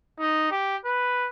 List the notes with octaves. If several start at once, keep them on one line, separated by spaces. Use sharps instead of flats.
D#4
G4
B4